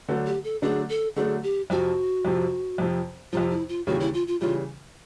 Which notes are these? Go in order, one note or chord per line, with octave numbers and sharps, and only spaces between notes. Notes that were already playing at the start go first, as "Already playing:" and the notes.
D3 F#3 A3 D4
G4
A4
D3 F#3 A3 D4 G#4
A4
D3 F#3 A3 D4 G#4
G4
F2 C3 F3 F#4
F2 C3 F3
F2 C3 F3
F2 C3 F3 F4
E4
F4
D#2 C#3 E3 G3 F#4
E4
F4
F4
C#3 E3 G3 F4